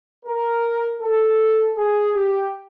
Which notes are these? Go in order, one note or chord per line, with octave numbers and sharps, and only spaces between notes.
A#4
A4
G#4
G4